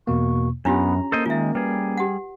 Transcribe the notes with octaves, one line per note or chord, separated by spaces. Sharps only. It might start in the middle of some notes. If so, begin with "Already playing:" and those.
E2 B2 A#3 C#6
F#2 B3 C#4 D4 F4 G4 A#5
A#3 A4 C5 D#5
D#3 G#3 F4 E5
G3 G#4 B4
G4 F#5